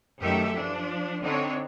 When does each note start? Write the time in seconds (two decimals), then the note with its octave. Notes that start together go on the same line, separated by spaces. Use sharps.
0.21 F#2 D#3 A3 G4 A4 E5
0.53 F3 D4
1.22 D3 C4 D4 D#4 C#5